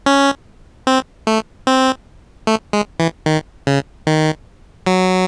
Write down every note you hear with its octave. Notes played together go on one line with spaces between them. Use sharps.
C#4
C4
A3
C4
A3
G#3
E3
D#3
C#3
D#3
F#3